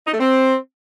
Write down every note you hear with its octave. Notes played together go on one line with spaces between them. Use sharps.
D#4
A3
C4